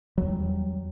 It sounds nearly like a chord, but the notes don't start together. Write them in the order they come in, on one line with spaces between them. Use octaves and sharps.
F#3 E2 G3